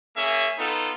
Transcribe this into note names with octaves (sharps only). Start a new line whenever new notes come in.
A#3 C#4 G#4 E5
B3 D#4 F4 A4